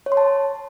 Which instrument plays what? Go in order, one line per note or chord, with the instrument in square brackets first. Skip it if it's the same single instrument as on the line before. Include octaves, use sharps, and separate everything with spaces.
[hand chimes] C#5
C6
A5